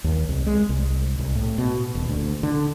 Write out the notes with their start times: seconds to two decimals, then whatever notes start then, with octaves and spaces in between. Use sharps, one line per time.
0.04 D#2
0.29 C2
0.46 G#3
0.69 C2
1.19 C2
1.35 A2
1.58 B2
1.95 D#1
2.09 D2
2.43 D3